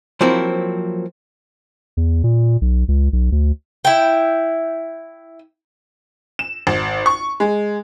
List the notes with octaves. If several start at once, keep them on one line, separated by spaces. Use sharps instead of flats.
F3 F#3 A#3 C4 E4
E2
A#2
B1
C#2
B1
D2
E4 G5
E7
G#1
C#6
G#3